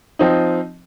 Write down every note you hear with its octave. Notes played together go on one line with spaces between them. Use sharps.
F3 C4 D#4